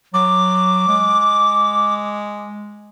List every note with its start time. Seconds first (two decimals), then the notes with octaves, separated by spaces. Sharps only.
0.14 F#3 D6
0.88 G#3